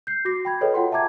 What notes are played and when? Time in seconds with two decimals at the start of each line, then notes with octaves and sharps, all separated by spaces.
0.07 G6 C7
0.25 F#4 D6 A#6 C7
0.45 G5 B5 G#6
0.61 G#4 A4 B4 C#5 D#5 G5
0.74 F4 F#5 G5 C6
0.92 E5 A5 A#5 D6 G#6